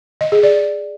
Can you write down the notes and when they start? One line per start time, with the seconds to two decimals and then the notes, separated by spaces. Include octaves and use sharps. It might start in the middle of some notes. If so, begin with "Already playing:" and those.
0.21 D#5
0.32 G#4
0.43 D5